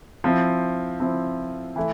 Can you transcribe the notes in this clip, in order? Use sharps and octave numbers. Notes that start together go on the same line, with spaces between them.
F3 C4 E4
F3 C4 E4
E3 A3 E4